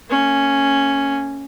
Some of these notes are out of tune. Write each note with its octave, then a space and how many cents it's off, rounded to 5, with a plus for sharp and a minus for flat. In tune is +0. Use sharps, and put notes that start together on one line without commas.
A#3 -25 C#4 +0